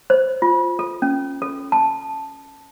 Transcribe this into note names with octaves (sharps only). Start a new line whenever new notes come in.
C5
F4
A4
C#4
A4
A5